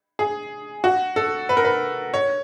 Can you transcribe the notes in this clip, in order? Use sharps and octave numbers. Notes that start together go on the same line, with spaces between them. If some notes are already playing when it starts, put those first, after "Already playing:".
G#4
F#4
A4
B4
A#4
B4
C#5